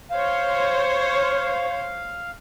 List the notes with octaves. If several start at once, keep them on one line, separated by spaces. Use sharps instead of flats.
C5 C#5 F5